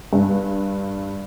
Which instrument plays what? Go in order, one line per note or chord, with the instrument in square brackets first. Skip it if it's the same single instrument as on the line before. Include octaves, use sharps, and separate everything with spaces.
[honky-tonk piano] G2